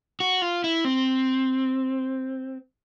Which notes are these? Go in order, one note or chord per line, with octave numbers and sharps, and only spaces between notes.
F#4
F4
E4
C4